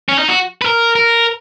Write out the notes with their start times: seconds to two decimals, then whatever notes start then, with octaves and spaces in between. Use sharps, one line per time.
0.09 C#4
0.19 D#4
0.28 F#4
0.62 B4
0.66 A#4
0.96 A#4